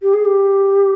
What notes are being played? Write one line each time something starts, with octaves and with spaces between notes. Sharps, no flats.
G4
G#4
G4